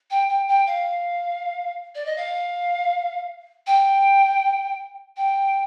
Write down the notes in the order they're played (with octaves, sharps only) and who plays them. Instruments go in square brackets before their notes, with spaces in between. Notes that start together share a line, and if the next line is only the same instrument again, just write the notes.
[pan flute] G5
G5
G5
F5
D5
D#5
F5
G5
G5